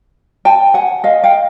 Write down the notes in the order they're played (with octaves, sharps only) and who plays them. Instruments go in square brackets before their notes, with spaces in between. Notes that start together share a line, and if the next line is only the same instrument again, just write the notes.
[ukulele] G5 A5
F#5 G#5
D#5 F5
F5 G5